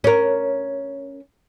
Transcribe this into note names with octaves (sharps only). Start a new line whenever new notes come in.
C#4 A#4